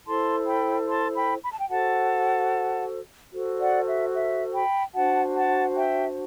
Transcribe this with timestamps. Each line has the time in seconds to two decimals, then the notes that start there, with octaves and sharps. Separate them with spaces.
0.06 E4 A4 C5 A5 C6
0.47 G5 B5
0.87 A5 C6
1.15 G5 B5
1.42 B5
1.52 A5
1.59 G5
1.69 F#4 A4 C5 F#5 A5
3.33 F#4 A4 C5
3.60 D5 F#5
3.87 E5
4.14 E5
4.54 G5 B5
4.94 D4 F#4 C5 F#5 A5
5.35 F#5 A5
5.76 E5 G5